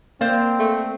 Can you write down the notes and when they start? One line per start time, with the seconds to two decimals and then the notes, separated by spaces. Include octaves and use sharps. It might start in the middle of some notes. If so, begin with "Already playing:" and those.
0.21 A#3 C4 C5 D5 F5
0.59 A3